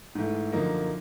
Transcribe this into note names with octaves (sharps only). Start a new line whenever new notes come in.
G#2 E3 A3
F#2 D3 F3 A#3 D#4